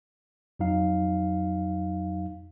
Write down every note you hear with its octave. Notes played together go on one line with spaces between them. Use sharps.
F2 F#3 D#4 F5